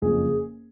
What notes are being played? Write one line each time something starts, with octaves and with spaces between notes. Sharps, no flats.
F#1 F2 C#3 G#4